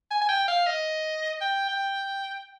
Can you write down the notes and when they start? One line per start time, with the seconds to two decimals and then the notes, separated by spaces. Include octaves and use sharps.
0.11 G#5
0.22 G#5
0.29 G5
0.48 F5
0.67 D#5
1.41 G5
1.69 G5